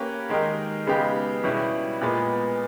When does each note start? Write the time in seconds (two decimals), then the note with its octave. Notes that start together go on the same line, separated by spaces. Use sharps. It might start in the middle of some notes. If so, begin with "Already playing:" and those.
Already playing: A#3 C#4 G4 B4
0.29 D#3 G#3 D#4 G4 A#4
0.87 C#3 G#3 B3 D#4 G4
1.44 B2 G3 C#4 E4
2.01 A#2 G#3 B3